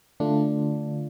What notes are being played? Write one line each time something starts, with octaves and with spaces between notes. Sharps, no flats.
D3 A3 D4 F4